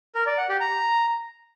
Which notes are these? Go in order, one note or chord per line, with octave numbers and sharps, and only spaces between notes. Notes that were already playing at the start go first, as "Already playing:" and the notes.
A#4
D5
F#5
G4
A#5